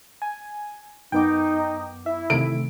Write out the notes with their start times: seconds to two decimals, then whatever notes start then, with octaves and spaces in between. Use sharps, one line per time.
0.22 G#5
1.12 F#2 B3 D#4 G5 D6
2.06 E4 E5
2.30 C3 D#3 E3 A3 D7